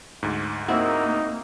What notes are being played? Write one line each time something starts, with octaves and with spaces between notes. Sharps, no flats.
D2 G#2
A#3 C4 D#4 E4 F#4